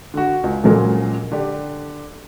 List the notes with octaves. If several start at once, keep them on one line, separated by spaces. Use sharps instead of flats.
D3 F#4
C#2
A#2 C#3 F3 F#3 G#3 A#3
D3 D4 G4